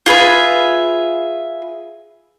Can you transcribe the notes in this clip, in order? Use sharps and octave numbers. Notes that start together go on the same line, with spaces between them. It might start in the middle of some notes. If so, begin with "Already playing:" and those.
F4 G#4 B4 E5